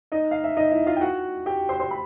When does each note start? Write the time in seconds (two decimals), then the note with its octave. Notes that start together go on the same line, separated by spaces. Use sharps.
0.12 D#4 D#5
0.31 F5
0.44 E5
0.57 D#4 D#5
0.71 E4 E5
0.87 F4 F5
0.96 G5
1.01 F#4 F#5
1.46 G4 G5
1.69 C5 C6
1.80 C5 C6
1.91 B5